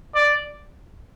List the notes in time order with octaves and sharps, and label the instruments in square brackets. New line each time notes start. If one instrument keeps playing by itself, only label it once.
[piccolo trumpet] D5